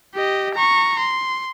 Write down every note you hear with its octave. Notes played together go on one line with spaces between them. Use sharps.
G4 D#5
A#5 C#6
C6